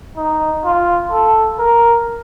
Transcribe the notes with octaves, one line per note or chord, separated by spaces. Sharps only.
D#4
F4
A4
A#4